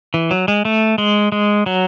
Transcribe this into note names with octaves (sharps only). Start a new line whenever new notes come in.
E3
F#3
G#3
A3
G#3
G#3
F#3